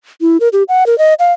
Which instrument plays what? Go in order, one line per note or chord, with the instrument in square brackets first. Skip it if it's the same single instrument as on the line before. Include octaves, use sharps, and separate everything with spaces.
[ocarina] E4
A#4
G4
F#5
A#4
D#5
F5